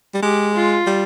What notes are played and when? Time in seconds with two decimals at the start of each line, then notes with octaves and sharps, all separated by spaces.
0.14 G3
0.22 G#3 G4
0.55 F4
0.87 G3